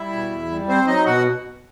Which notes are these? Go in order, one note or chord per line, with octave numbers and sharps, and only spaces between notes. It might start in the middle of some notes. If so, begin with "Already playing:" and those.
Already playing: G3 E4 E5
B2
E2
G3
C4 C5
F#3 D#4 D#5
B2 F#4 F#5